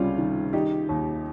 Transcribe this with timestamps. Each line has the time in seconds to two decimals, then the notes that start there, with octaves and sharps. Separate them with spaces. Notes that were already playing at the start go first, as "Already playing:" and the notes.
Already playing: C#2 C3 G3 C#4 F4
0.18 D#3
0.53 D#3 D#4 G4
0.89 D#2